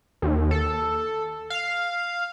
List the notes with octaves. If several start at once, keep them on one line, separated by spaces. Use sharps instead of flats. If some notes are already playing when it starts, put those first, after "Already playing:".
D#2
A4
F5